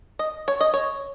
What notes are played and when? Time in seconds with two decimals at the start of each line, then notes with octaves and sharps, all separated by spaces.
0.19 D#5
0.48 C#5
0.61 D#5
0.74 C#5